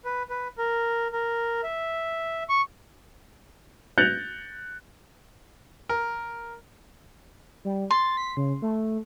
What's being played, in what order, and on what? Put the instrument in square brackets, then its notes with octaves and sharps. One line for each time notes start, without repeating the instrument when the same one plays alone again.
[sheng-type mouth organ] B4
B4
A#4
A#4
E5
C#6
[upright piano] F#6 G6 A6 A#6 C#7 F7
[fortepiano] A#4
[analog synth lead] G3
[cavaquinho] C6 [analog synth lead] A6
[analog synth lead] B6
C#3
A3